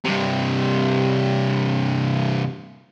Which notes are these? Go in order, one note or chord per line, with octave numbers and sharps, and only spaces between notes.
G2 C3